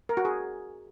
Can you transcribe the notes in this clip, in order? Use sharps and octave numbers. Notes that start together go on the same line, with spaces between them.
A#4
F#4
G#4